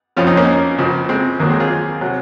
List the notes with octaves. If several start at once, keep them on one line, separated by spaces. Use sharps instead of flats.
F2 C#3 F3 C#4 F4
C4 D#4
A#3 C#4
C#2 C#3 F3
G#3 C4
D#2 D#3 F#3 A#3
G#3 C4
F4 G#4
C3 F#3